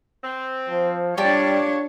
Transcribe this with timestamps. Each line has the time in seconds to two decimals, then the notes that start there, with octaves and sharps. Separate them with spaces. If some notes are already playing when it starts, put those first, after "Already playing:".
0.24 C4
0.69 F3
1.17 G3 D4 F4 G4 C#5 D5 A5